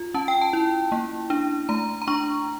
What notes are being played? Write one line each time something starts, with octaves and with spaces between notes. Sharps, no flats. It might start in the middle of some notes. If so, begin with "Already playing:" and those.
Already playing: F4
C#4 A5
G5
A5
E4
A#3
D4
A3 A#5
A#5
D4 C#6